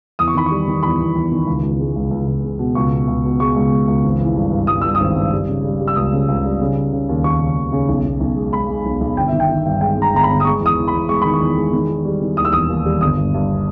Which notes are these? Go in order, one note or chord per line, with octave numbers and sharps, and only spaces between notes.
E2 D#6
C#6
D#3 B5
G3 C#6
D#3
E2 B5
E2
E2
D#3
C#2
C#2
G#3
C#2
C#2
C#2
G#3
B2
C#2 C#6
B2
C#2
B2
G#3 C#6
C#2
G#3
C#2
G#1
E3
G2
G2
G2 D#6
G2 E6
D#6
G#1
G2
G3
C#3
G3
G3
E6
C#2 D#6
C#3
C#2
G3
C#3
C#3
C#3
D#2
D#2 C#6
C#3
D#2
C#3
B1
B1
B1
G#3
G#3 B5
G#3
B1
B1
G1 G5
D#3 E5
G5
D#3
G2
G#3 G5
G#3
A#5
G1 A#5
B5
G1
D#6
G#3 C#6
E2
D#6
E2
B5
E2
G#3 C#6
D#3 B5
C#6
E2
G#3
D#3
D#3
G3
D#3
D#2 D#6
E6
E1 D#6
D#2
G3
G1 D#6
G2
G2